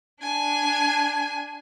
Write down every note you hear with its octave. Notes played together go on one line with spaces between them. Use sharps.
D4 G#5